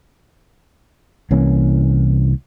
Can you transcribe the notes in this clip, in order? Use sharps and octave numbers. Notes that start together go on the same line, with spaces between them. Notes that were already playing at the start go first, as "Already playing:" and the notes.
C2 E3 A#3 C#4